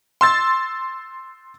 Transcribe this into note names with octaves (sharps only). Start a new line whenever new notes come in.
C6 E6 A6